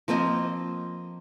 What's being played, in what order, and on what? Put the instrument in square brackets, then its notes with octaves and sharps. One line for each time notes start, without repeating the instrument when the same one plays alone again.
[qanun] F3 A#3 C4 D#5